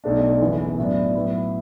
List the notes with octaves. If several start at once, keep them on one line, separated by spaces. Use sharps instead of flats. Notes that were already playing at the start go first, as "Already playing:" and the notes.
B1 B2 A3 D4
F#1 F#2 E3 B3 E4
A2 F#3 B3 D4
A2 F#3 B3 E4